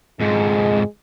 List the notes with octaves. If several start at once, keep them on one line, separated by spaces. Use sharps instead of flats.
F2 G#2 G#3